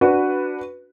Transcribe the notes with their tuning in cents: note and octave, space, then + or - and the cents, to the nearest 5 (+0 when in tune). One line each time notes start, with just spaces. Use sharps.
D4 +0 F#4 +0 B4 +0